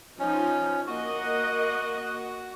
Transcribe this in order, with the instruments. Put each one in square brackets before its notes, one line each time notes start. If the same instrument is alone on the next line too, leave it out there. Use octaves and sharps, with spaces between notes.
[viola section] F3 D#4 [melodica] C#4
[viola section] A#3 D#5 F#5 [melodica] F#4